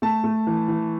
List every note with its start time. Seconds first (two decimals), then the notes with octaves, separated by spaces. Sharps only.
0.02 A3 A5
0.24 A3
0.47 E3
0.68 E3